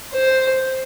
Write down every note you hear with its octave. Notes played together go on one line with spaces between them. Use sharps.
C5